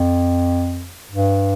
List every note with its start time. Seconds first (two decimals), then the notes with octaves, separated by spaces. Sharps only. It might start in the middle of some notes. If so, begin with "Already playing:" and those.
Already playing: F2
1.11 G2